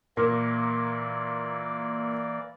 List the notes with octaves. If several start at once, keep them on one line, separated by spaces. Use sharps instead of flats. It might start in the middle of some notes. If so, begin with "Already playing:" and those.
A#2 E3 A#3 A#4 D5